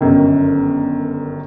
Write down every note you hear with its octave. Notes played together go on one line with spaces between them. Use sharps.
G1 F#2 D#3